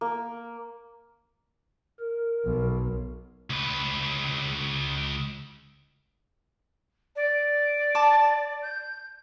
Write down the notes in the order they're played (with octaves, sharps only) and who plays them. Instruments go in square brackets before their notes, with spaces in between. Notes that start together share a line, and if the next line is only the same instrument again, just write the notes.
[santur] A#3
[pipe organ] A#4
[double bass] B1
[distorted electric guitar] C#2 B4
[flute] D5
[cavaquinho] A5 D6
[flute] G6